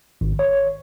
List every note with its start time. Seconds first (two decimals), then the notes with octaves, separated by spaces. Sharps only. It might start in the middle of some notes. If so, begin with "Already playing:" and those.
0.21 G#1
0.39 C#5